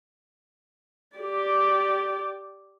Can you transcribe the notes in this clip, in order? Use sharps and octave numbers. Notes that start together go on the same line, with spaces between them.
G4 D5